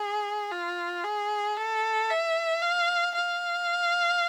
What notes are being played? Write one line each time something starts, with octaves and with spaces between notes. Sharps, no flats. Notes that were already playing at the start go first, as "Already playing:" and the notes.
Already playing: G#4
F4
G#4
A4
E5
F5
F5